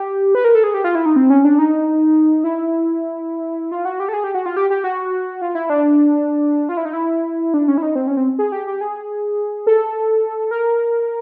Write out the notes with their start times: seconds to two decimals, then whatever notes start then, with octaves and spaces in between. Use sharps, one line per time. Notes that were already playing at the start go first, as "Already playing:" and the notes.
Already playing: G4
0.35 B4
0.45 A#4
0.55 A4
0.64 G#4
0.74 G4
0.84 F4
0.95 E4
1.06 D#4
1.16 C4
1.30 C#4
1.45 D4
1.59 D#4
2.44 E4
3.71 F4
3.85 F#4
4.00 G4
4.09 A4
4.13 G#4
4.24 G4
4.35 F#4
4.46 F4
4.57 G4
4.70 G4
4.84 F#4
5.42 F4
5.55 E4
5.70 D4
6.69 F4
6.77 E4
6.85 D#4
6.93 E4
7.54 D4
7.68 C#4
7.77 E4
7.82 D#4
7.96 C4
8.07 C#4
8.17 C4
8.39 G#4
8.52 G4
8.67 G4
8.81 G#4
9.67 A4
10.51 A#4